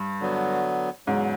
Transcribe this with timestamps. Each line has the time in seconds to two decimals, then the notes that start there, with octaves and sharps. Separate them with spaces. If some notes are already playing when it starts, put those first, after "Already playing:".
Already playing: G2
0.20 D3 F#3 B3
1.07 E2 G#2 C#3 F#3